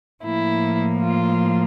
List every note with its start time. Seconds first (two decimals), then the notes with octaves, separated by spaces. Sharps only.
0.24 A2 F3 A#3 E4
1.01 F4